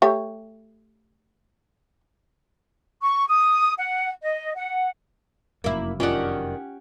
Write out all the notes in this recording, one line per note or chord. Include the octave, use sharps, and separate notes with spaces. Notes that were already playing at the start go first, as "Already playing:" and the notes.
A3 G4 C#5
C#6
D#6
F#5
D#5
F#5
F1 F#2 A#3 E4
D#3 C#4 D4 F4 G4 F#5